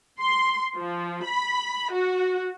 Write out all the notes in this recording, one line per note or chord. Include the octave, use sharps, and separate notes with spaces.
C6
F3
B5
F#4